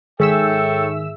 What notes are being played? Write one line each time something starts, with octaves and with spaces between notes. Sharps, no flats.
G#2 D#3 G#4 A4 C#5 E5 G5 E6